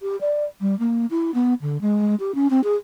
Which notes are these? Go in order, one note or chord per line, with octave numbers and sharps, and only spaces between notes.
G4
D5
G3
A#3
E4
B3
D3
G#3
G4
C#4
C4
G#4